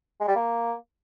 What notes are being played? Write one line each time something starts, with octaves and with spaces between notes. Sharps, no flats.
G#3
G3
A#3